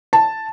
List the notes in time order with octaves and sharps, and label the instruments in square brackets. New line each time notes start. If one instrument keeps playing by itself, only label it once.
[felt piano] A5